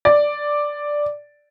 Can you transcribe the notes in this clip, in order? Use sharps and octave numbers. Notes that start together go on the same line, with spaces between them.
D5